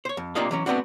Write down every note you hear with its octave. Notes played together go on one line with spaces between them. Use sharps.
C5 C#5
F2
C3 A#3 D4 F4 D#5 F5
E3 F#3 C#4
A3 B3 C4 D4 F#4